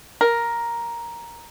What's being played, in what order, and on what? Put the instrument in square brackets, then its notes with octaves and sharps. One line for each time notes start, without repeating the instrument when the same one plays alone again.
[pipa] A#4